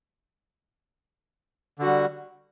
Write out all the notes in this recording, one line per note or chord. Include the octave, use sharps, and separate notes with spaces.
D3 G3 F#4